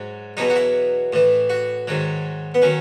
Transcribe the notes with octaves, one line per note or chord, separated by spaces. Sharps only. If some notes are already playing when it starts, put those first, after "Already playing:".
Already playing: G#2 F#3
E2 B2 F#3 D#4
F#4
E4
A2 E3
F#4
G#2 D#3 F#3
B3
D#3 F#3 C#4